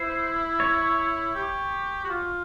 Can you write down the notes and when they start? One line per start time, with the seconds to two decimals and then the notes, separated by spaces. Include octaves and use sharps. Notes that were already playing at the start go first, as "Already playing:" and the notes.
Already playing: E4 C5
0.60 C#5
1.35 G4
2.04 F#4
2.10 F4